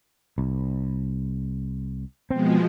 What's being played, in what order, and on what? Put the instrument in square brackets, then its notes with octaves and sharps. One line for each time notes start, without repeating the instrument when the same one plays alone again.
[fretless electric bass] C2
[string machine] B2 F3 G#3 [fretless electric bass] C4